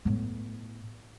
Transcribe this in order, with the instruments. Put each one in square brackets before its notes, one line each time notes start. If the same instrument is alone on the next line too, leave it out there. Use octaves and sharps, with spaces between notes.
[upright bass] A2 B3